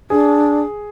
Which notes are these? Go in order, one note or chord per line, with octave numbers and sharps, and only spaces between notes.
D4 G#4